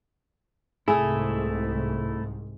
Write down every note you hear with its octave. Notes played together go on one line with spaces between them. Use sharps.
C2 G#2 A3 E4 G#4